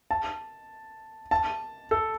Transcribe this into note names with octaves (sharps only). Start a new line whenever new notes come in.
A5
A5
A4